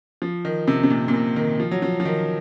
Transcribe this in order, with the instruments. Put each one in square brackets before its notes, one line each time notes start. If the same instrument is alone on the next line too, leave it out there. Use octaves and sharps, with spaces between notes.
[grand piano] F3
D#3
C3
C3
A#2
A#2
C3
D#3
F3
F#3
F3
F3
D#3